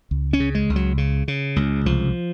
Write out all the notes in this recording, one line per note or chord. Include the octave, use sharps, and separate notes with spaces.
C#2
C#4
C#3
G#3
C#2
F#3
C#3
C#3
C#2
C2 F3